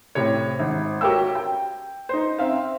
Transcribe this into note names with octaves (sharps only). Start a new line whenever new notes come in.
A2 C3 C#5
G#1
F#4 G4 A#4 C#5 G5 E6
G5
D#4 C5
C4 E5 F5